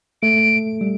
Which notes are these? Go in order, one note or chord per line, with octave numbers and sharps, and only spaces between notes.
A3 D7
G3